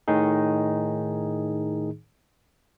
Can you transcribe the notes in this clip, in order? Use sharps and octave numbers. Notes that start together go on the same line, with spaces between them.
A2 D#3 D#4 G#4